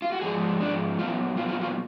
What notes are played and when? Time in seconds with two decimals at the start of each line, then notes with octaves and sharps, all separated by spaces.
0.02 F4
0.12 F#4
0.21 G#2 F3 G#3 G#4
0.60 G#2 F3 G#3 D4
0.98 A#2 F#3 B3 F4
1.37 A#2 F#3 B3 F4
1.49 F4
1.61 F4